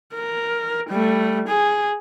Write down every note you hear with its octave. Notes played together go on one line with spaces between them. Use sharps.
A#4
G3 A3
G#4